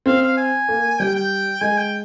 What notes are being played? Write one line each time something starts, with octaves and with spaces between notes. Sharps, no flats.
C4 F5
F5
G#5
A#3
G3 G5
G5
G#3 G#5
G5